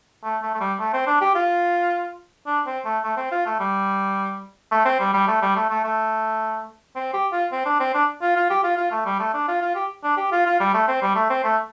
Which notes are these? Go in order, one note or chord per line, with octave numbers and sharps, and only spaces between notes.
A3
A3
A3
G3
A3
C4
D4
G4
F4
D4
C4
A3
A3
C4
F4
A3
G3
A3
C4
G3
G3
A3
G3
A3
A3
A3
C4
G4
F4
C4
D4
C4
D4
F4
F4
G4
F4
F4
A3
G3
A3
D4
F4
F4
G4
D4
G4
F4
F4
G3
A3
C4
G3
A3
C4
A3